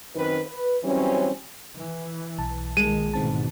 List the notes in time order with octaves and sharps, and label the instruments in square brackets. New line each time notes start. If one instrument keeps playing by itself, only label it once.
[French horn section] F#2 D#3 C4 B4
B4
E3 F#3 G3 C4 C#4
[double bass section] E3
[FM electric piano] B1 A5
[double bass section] A#2 D#3 [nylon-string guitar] G#3 [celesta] D#7
[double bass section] A1 G#2 B2 [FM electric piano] D#3 C4 A5